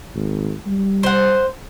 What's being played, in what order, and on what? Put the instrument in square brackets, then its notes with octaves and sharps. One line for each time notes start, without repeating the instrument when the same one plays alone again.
[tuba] G#1
G3
[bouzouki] C5 F#5